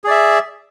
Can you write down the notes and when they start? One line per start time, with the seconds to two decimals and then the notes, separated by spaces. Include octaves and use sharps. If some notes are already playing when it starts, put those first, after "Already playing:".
0.04 G#4
0.07 D5
0.11 E5